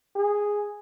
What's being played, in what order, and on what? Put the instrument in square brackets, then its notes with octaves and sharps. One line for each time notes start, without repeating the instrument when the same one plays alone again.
[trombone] G#4